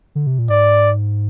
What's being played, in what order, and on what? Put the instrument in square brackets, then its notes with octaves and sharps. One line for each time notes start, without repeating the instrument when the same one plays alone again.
[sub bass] D3
C3
A#2
[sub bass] G#2 [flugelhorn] D5